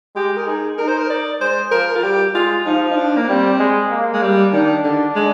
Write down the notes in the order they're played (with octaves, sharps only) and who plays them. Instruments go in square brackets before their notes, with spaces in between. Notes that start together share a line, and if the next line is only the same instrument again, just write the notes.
[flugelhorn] G#3 [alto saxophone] G4
[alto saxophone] A#4
[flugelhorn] D#4 [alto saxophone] G#4
[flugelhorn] D#4 [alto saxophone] A#4
[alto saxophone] C5
A#4
D5
[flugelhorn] G#3 [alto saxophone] C5
[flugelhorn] F3 [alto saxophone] A#4
[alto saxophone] F4
[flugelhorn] G3 [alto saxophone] G4
[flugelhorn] G#3 [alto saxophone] F4
[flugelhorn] F3 [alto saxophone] D#4
[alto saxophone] D#4
D4
A#3
[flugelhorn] G3 [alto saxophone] C4
[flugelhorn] G#3
A#3
[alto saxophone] G#3
G3
[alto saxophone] D#3 [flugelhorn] D4
[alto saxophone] D3
G#3